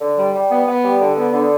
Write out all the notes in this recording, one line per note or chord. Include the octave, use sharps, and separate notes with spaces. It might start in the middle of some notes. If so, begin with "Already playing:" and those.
D3
G3
G3
B3
B3
G3
D3
B3
D3